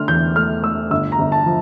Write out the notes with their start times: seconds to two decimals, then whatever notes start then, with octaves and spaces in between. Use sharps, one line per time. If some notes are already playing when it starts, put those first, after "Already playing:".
Already playing: D3 A3 C6 F6
0.08 E2 G6
0.36 A3 F6
0.63 A3 E6
0.91 G1 E6
1.12 A#5
1.19 G1
1.32 A5
1.46 F3